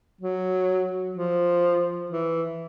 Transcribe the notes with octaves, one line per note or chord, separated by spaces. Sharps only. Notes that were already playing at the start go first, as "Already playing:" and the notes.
F#3
F3
E3